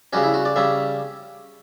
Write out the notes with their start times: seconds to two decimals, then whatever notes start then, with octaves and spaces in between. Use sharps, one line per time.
0.13 C#3 G3 C#4 F#4
0.23 E4
0.34 F#4
0.45 D5
0.56 C#3 G3 C#4 E5